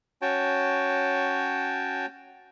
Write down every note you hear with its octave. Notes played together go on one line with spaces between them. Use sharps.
C#4 F#4 C#5 G5 A5